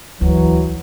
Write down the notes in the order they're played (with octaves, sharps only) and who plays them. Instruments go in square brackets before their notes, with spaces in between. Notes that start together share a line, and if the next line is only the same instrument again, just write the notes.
[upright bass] D2 [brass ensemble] E3 F#3